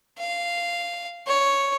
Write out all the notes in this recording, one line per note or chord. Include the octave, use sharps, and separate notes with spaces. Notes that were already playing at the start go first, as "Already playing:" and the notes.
F5
C#5